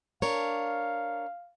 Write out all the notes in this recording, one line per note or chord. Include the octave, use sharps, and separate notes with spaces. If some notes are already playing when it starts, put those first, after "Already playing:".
D4 A#4 C#5 F5